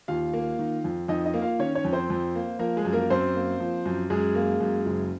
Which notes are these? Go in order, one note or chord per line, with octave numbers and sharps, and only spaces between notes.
D#2 F4 F5
A#3
D#3
F2
F2 D#4 D#5
D#4 D#5
A#3
F4 F5
D#3 C#4 C#5
C#4 C#5
F2
C4 C5
F2
A#3
F3 A#3 A#4
G#3 G#4
F#2
A#3 A#4
F#2 C4 C5
A#3
F3
F#2
F#2 G#3 G#4
A#3
F#2
F#1